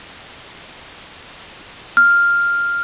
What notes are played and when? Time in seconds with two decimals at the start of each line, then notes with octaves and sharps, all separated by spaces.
1.97 F6